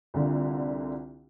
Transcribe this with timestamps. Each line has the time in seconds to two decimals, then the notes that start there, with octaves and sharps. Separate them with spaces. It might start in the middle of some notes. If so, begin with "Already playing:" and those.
0.14 C2 D3 F4